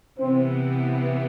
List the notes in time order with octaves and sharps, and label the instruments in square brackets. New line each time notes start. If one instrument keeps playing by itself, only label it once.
[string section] C3 E3 B3 [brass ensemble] C4